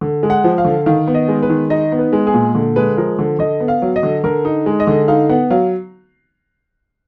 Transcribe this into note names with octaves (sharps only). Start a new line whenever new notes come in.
D3
G#3
F#5
F3
F5
D3
D#3 F5
B3
D#5
G#3
B4
D#3
D#4 D#5
B3
B4
G#3
G#4
A#2
D3
G#3 B4
F3 A#4
D3
D3 D#5
B3
F5
F#3
D#5
D3
D3 A#4
D#4
G#3
D#5
D3
D#4 F5
B3 F#5
F#3 F5